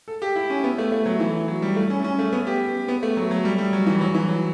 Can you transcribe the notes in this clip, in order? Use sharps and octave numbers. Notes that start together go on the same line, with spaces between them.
A4
G4
E4
C#4
B3
A3
A3
F#3
E3
F#3
G3
A3
C#4
C#4
A3
B3
G4
B3
A3
F#3
F#3
G3
G3
F#3
E3
F#3
E3
F#3